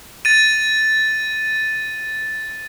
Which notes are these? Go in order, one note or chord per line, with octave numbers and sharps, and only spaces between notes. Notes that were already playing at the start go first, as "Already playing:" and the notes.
A6 D#7